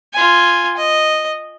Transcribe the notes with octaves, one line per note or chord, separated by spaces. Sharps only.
F4 G#5
D#5